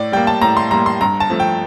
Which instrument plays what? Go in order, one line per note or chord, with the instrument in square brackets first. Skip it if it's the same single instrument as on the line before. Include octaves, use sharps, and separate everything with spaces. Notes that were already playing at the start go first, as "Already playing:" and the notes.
Already playing: [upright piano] A2 D5
G3 A#3 G5
A5
A2 A#5
C6
G3 A#3 A#5
C6
G2 A#5
A5
F3 A3
G5